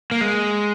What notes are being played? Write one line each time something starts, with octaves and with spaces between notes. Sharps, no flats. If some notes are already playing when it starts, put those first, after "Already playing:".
A#3
G#3